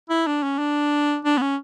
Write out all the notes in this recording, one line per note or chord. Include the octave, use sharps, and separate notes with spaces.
E4
D4
C#4
D4
D4
B3
C#4